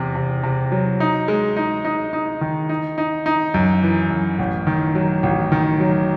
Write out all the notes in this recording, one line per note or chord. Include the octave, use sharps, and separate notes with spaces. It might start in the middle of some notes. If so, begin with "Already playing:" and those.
Already playing: E2 C3
C3
C3
F#3
D#4
G#3
D#4
D#4
D#4
D#3
D#4
D#4
D#4
F#2
E3
F#2
A1
D#3
F#3
A1
D#3
F#3